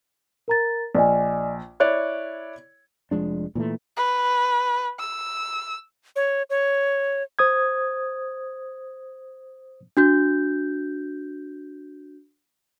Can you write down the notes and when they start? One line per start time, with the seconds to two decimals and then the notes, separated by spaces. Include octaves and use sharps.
0.48 A#4 A#5 A6
0.95 A#1 D5 D#5 G#5
1.80 E4 C#5 D5 F#6
3.11 F1 F3 G#3 D4
3.55 A#2 E3 G#3 A3
3.97 B4
4.99 E6
6.16 C#5
6.50 C#5
7.39 C5 D#6 G#6
9.97 D4 F#4 G6